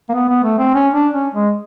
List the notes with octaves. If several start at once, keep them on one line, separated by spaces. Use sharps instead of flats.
A#3
B3
B3
A3
C4
C#4
D4
C#4
G#3